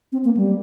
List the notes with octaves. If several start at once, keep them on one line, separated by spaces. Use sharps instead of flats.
C4
A#3
G3